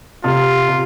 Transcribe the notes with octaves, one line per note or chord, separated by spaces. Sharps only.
C3 F4
C3